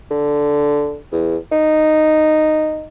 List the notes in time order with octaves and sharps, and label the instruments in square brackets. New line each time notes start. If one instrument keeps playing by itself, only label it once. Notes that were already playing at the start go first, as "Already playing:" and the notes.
[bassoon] D3
E2
D#4